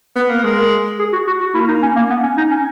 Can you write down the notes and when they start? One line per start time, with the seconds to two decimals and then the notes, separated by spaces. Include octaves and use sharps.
0.16 B3
0.30 A#3
0.43 G#3 A#4
0.99 G#4
1.13 F#4
1.27 F#4
1.40 F#4
1.54 A#3 E4
1.68 D#4
1.82 C#4
1.96 A#3
2.10 B3
2.23 C#4
2.37 D#4
2.51 C#4